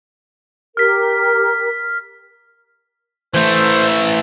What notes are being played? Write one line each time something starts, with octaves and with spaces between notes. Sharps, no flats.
G4 A#4 F6 B6
E3 A3 C5